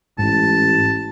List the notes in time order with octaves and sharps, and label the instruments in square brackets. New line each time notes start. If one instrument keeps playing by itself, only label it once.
[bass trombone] A1 [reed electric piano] G#2 [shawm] A5